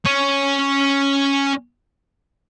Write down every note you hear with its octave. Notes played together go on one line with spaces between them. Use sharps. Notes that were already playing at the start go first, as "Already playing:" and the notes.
C#4 C#5